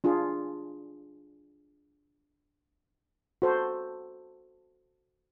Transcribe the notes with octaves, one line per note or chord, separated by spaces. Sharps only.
D4 F4 G#4
F#4 A4 C5